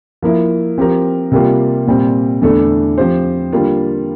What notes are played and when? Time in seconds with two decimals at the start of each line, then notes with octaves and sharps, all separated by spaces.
0.22 F3 A#3 E4 A#4
0.78 F3 C4 G4 A#4
1.32 C3 G3 A#3 F4
1.87 A#2 G3 C4
2.42 E2 D3 A3 D4 A4
2.98 F3 C4 G4 C5
3.53 D3 G3 A#3 F4